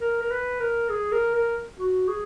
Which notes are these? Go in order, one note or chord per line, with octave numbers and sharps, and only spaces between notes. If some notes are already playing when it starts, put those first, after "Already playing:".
A#4
A#4
B4
A#4
G#4
A#4
A#4
F#4
G#4